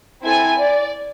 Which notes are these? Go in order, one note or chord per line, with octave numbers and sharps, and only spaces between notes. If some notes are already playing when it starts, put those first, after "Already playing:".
C4 E4 A4 G#5
D5